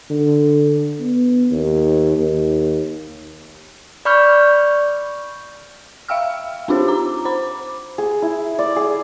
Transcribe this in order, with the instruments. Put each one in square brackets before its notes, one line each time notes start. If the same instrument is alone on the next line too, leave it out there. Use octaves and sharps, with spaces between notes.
[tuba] D3
B3
D#2
D#2
[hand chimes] D5 B5 C#6 F6 G6
[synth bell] E5 F5 G5 E6 F6
C4 D4 D#4 F4 G4 C5
A#5 D6
C5 B5 D6
[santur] G#4
E4
D5
G#4